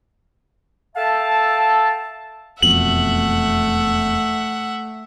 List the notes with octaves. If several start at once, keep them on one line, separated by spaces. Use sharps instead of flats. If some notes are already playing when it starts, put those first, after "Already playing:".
A4 E5 F5 G5 A5
E1 F2 B2 A3 E5 F#5 F#7